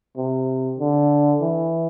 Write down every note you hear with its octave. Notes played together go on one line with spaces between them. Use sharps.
C3
D3
E3